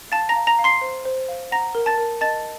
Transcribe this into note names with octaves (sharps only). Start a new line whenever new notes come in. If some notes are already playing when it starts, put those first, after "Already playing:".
F5 A5 A6
A#5 A#6
F5
A#5 A#6
F5
C6 C7
C5
C5
F5
F#5 A#5 A#6
A#4
A5 A6
A#4
D#5 A5 A6